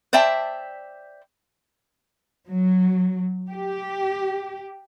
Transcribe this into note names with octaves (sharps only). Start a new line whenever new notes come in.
C5 D5 E5 G5 A5
F#3
G4